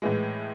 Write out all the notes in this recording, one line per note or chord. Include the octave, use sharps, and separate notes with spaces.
A2 E3 G#3